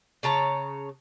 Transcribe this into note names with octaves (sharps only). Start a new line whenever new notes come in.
C#3 C#5 A5 A#5